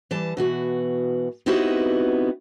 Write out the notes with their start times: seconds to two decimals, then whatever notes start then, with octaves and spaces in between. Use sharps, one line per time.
0.11 E3 G3 A5
0.37 B2 E3 F#4
1.46 B3 C4 D#4 E4 F#4 G4